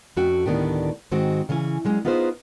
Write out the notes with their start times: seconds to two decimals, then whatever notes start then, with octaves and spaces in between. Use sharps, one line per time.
0.16 F2 A3 C#4 F#4 G5
0.46 D2 A2 D#3 B3 D4 G4
1.11 G#2 D#3 G#3 C4 F#4
1.49 C#3 E3 C#4 G#5
1.85 F#3 G#3 C#4
2.05 B3 D#4 F4 G#4 B4 C5